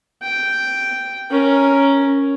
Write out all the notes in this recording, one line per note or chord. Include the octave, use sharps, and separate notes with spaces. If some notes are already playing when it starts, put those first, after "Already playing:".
G5
C#4 A#4